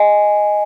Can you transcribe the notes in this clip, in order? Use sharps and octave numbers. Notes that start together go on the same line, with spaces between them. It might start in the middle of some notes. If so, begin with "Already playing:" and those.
Already playing: D#5 G#5